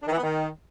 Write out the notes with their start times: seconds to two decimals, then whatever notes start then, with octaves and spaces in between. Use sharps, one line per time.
0.02 D4
0.07 D#3
0.12 E3
0.18 B3
0.23 D#3